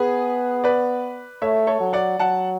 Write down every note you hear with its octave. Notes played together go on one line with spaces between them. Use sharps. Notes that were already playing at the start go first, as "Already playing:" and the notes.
Already playing: B3 G#4 B4
B4 D5
A3 C#5 E5
A4 C#5
F#3
D5 F#5
F#3 F#5 A5